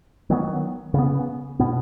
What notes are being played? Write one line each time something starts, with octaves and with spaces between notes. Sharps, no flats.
D#3 F#3 B3
C#3 B3
B2 B3